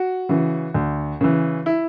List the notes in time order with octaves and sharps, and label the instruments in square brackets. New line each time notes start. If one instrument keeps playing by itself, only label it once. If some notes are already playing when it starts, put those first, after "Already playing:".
Already playing: [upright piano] F#4
[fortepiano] C#3 E3
D2
C#3 E3
[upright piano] E4